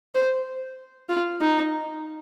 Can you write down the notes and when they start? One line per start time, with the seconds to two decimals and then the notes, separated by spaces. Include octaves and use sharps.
0.14 C5
1.09 F4
1.41 D#4